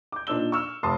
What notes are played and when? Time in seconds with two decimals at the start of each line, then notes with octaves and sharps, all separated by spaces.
0.12 D6 G6
0.27 A#2 D4 D#4 A5 E6 G7
0.52 C#6 E6 F6
0.83 F1 A5 C6 D6 D#6